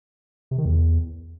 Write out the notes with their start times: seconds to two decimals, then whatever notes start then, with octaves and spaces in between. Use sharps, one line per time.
0.51 C3
0.58 D#3
0.65 E2